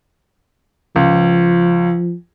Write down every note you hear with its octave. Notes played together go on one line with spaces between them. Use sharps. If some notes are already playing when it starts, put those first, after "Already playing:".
C#2 F3